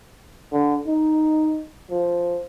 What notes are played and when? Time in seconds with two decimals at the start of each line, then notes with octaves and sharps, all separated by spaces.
0.52 D3
0.87 D#4
1.90 F3